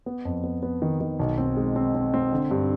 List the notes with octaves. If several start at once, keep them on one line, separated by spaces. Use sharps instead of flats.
B3
F2
B3
B3
D#3
D#3
B1
C4
G#3
C4
C4
C4
D3
G2